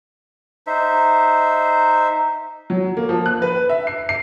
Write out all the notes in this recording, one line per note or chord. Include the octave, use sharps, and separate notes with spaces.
D#4 C5 E5
F#3
A#3
F3
F#6
B4
E5
C7
C7